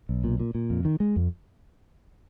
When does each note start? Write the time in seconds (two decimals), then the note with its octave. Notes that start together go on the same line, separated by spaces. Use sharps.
0.09 B1
0.24 A#2
0.40 A#2
0.55 A#2
0.70 F2
0.85 D#3
1.00 G#3
1.16 F2